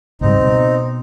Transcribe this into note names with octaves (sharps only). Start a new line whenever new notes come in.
C#2 G#2 G3 C4 D#4
B2